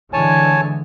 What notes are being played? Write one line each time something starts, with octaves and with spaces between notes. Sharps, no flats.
D3 E3 G#3 C#5 G#5 A5